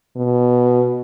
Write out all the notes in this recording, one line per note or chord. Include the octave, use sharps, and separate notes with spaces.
B2